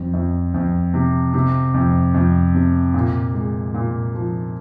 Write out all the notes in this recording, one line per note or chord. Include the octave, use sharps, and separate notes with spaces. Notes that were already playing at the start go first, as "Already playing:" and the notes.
Already playing: F2
F2
F2
C3
C3
F2
F2
C3
A#2
G#3
A#2
F3